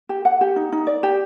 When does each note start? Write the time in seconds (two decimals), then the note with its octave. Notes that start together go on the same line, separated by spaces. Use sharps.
0.09 G4
0.25 F#5
0.41 G4
0.56 D#4
0.72 D#4
0.87 D5
1.03 G4